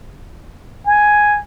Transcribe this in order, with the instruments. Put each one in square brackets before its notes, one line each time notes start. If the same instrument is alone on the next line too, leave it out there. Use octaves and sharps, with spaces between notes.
[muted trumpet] G#5